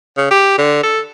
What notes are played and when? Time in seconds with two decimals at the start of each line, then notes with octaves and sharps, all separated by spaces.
0.17 C#3
0.31 G4
0.58 D3
0.83 A4